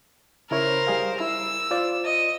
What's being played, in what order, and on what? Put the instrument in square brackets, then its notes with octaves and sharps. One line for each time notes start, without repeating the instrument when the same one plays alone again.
[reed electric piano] C#3 E4 C#5 [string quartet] A#4 C5
[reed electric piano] G3 G#4 F5
[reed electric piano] E4 [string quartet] E6
[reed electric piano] F4 C5 D5
[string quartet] D#5